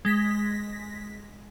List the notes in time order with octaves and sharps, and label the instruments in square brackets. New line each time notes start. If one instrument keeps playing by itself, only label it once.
[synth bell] G#3 A#6 B6